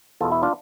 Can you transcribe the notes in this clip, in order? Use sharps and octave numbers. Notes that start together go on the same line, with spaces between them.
E2 B2 B3 F4 A4
E4
D4 F4